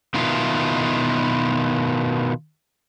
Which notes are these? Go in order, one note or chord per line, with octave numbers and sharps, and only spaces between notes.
B2 D#3 E4 F4